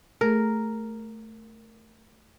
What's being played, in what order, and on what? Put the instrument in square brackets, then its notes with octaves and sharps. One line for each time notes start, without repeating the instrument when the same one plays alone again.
[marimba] A3 G#4 [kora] A#4